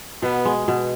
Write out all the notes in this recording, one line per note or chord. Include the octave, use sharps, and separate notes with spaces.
B2 B3
G#3
B2